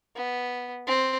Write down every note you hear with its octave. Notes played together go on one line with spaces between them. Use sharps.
B3
C4